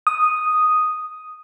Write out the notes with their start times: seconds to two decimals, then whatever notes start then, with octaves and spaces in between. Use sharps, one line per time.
0.07 D#6